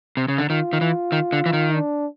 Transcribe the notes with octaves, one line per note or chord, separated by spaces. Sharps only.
C3
C#3
D3
D#3 F4
D#3
E3
D#3
D3
E3
D#3
D4